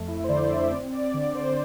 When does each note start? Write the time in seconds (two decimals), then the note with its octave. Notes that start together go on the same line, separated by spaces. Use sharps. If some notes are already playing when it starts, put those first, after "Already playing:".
Already playing: F2 A3
0.08 E4
0.24 C5
0.29 D3 D5
0.50 E5
0.71 C4 D5
0.92 D5
1.14 D3 D5
1.35 C5